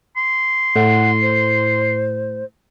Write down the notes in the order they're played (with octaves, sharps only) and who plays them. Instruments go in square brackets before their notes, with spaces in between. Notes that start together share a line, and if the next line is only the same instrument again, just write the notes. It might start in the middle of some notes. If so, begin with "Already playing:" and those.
[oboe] C6
[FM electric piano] A2 [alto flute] F#5
[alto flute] C5